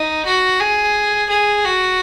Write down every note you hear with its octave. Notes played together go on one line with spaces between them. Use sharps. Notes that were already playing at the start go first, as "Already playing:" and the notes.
Already playing: D#4
F#4
G#4
G#4
F#4